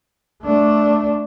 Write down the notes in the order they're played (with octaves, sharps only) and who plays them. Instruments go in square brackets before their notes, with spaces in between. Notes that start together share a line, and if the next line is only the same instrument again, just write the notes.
[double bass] A3 D4